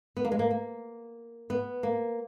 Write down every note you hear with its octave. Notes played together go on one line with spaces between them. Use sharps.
B3
A#3
G#3
A#3
A#3
B3
A#3